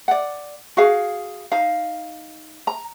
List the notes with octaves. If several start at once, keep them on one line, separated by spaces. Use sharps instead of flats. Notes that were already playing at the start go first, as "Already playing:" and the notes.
D5 F#5
F#4 G#4 F5
D#4 F5
A#5